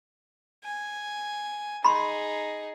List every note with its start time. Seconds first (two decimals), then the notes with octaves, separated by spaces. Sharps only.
0.64 G#5
1.85 D#4 G#4 B5 C6